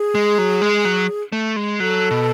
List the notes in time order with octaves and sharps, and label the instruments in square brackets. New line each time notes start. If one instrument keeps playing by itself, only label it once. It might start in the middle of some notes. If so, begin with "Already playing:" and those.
Already playing: [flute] G#4
[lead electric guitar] G#3
F#3
G#3
F#3
A3
G#3
[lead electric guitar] F#3 [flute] A4
[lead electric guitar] B2